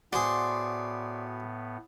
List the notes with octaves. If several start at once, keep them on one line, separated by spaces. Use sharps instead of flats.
A2 B3 F#4 G#4 C5 D5